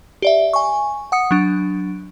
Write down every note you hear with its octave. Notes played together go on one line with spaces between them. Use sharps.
G4 D5 E5
G#5 C#6
F#5 D#6 C#7
F#3 D4